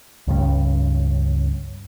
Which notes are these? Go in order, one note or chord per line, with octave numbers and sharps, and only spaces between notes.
C#2 G2 G3 C#4